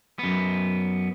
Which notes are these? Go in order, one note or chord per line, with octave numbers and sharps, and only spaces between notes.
F#2 B3